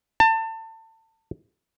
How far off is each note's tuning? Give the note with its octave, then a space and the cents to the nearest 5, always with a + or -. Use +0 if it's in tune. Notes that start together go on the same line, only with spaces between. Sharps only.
A5 +30